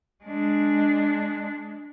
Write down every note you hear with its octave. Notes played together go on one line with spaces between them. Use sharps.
G#3 D4